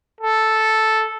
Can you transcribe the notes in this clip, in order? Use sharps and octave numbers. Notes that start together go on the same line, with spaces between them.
A4